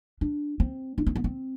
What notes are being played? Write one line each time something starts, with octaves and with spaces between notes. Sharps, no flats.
D4
C4
D4
C4
B3
C4